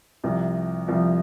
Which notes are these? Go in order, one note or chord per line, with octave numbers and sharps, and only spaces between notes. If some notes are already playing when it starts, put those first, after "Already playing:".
C2 C3 F3
C2 C3 F3